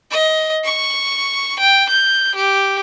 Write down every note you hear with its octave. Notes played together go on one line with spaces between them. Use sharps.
D#5
C#6
G5
G6
G4